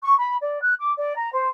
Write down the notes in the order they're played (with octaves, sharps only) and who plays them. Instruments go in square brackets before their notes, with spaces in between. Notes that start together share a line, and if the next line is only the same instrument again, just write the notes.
[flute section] C#6
B5
D5
F#6
D6
D5
A#5
C5